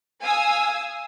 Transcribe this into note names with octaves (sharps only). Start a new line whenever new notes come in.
F5 G#5 D#6 E6